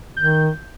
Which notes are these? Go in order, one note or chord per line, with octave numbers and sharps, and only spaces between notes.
D#3 G6